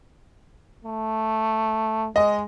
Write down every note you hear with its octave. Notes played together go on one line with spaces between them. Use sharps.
A3
G#3 D#5